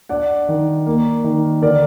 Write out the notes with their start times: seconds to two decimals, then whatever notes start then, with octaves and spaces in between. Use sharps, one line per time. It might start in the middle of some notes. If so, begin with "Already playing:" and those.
0.09 D4 D5 F#5
0.48 D#3
0.87 A#3
1.24 D#3
1.62 D3 A#4 D5